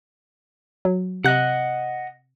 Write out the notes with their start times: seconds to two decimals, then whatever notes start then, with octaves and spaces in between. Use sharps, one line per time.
0.85 F#3
1.24 C3 D#5 F#5 F#6